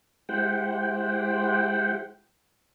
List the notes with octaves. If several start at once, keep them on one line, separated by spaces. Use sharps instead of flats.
G#3 E4 G4 C5 F#5 G5